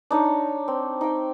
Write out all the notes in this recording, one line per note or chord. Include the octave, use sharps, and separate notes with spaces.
D4 D#4 C#5
C4
D#4 G5